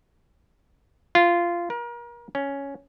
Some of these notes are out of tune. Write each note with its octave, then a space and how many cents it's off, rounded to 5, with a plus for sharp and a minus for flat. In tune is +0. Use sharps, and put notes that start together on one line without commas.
F4 -15
A#4 +35
C#4 +5